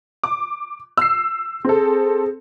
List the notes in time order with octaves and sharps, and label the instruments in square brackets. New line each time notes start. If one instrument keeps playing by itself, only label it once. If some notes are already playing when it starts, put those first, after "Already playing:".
[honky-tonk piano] D6
E6 C7
[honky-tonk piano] C4 A4 [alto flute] G#4